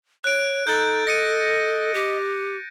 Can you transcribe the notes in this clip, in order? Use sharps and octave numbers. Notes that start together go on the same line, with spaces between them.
C#5 F#6 D7
D#4 A4 G6 A6
D#5 A#6 C#7 D#7
G4